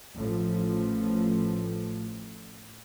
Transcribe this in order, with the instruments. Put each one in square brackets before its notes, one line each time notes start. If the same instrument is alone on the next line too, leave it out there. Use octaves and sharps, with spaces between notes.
[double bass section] A1 A2 F3